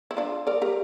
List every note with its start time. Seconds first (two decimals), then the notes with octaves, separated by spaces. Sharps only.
0.11 E4
0.17 D4 F4
0.47 A#4 D5
0.62 G4 A#4